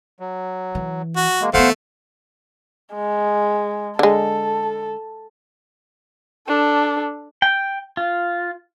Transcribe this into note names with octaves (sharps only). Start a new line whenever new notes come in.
F#3
E3
F#4
G#3 A#3
E3 A3 B3 C5 F5 F#5
G#3
D3 G#3 A4
D4 A4
G5
F4